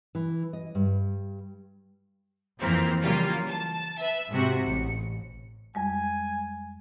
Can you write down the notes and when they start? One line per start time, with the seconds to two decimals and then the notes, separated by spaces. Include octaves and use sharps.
0.15 E3
0.53 D#5
0.75 G2
2.60 F2 E3 F3 A#3 C4
3.02 C#3 E3 F#3 G3 A#3 F4
3.48 A5
3.99 B4 E5
4.30 G#2 C3 C4 F#4
4.65 A1 C#7
5.75 F2 G3 G#3 G#5